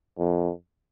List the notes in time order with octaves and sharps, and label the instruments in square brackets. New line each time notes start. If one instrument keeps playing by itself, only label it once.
[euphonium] F2